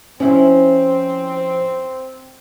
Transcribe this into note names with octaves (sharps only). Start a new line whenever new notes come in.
F3 C4 C#4 E4